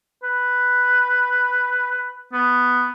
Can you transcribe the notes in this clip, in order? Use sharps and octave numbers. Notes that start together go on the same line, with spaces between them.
B4
B3